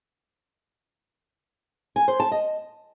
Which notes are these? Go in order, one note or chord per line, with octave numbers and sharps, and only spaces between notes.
G#5
C5
A5
D#5